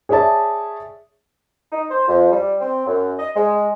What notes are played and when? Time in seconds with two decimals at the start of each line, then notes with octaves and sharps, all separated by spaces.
0.09 G#4 C#5 D5 E5 A5
1.72 D#4
1.91 C5
2.08 F2
2.32 G3
2.61 C4
2.87 F#2
3.19 D#5
3.36 G#3